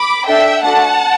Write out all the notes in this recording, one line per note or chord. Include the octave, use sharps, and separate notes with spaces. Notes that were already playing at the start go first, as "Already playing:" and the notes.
Already playing: B5 D6
D4 A4 E5 G5
A3 D4 F#4 A4 F#5 A5